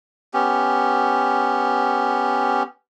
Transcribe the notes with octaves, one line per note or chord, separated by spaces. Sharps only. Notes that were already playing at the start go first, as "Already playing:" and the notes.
B3 C#4 G4